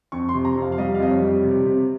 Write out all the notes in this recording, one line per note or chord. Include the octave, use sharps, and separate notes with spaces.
F2 C#6
C6
C3
A#5
F2
F5
F5
G3 D#5
F5
F2 D#5
C#5
G3
C3
C3